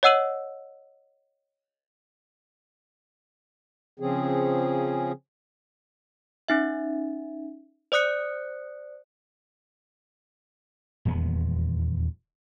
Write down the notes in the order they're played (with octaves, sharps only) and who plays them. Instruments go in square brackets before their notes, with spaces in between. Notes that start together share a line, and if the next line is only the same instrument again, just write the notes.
[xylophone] C#5 D#5 F#5 E6 D#7 F#7
[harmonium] C#3 F3 C4 C#4 G#4
[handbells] C#4 D#4 E5
C5 D5 D#6 F#6 C#7
[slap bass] D#1 E2 G#3 B3